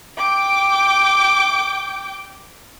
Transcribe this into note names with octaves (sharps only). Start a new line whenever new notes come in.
G5 D6